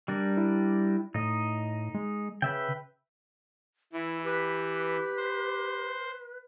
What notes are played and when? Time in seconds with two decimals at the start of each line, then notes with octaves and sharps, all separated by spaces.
0.08 G3 D4 A#4
0.37 E4
1.14 A2 D#4 D#5
1.95 G#3
2.42 C#3 B4 E5 G5
3.93 E3 E4
4.24 G4 B4
5.17 C5